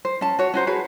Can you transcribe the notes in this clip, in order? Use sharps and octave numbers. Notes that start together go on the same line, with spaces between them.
C5
C#4 A5
F#4 C#5
C#4 F#4 C5 A#5
F#4 G#4 B4